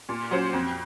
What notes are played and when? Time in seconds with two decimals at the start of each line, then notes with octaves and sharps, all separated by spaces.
0.09 A#2
0.31 F#3 C#4 F#4 C5
0.53 F2